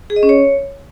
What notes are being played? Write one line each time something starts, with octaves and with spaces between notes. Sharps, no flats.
G#4
D#5
C#4
C#5